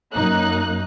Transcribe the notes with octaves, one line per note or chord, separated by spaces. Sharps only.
F#2 A#3 D#4 F#6